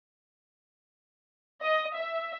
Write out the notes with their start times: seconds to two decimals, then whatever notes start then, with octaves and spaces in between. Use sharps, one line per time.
1.63 D#5
1.97 E5